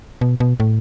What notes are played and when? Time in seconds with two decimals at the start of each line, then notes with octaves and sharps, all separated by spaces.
0.21 B2
0.40 B2
0.60 A2